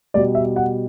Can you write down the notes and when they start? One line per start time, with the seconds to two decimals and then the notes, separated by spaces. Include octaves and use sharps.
0.14 B2 G3 D5
0.35 E5
0.56 F#5